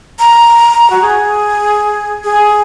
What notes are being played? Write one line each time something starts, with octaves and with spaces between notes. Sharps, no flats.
A#5
F#4
G#4
G#4